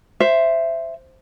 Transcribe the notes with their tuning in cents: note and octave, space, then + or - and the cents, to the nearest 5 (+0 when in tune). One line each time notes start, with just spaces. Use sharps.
C5 +0 E5 +10